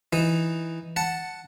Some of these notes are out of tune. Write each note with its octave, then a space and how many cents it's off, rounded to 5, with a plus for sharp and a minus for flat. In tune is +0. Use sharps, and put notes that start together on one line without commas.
E3 +0 D#4 +0
F#5 +0 A5 +0